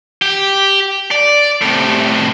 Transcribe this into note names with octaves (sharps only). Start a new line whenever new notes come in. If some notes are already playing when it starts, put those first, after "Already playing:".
G4
D5
A2 C3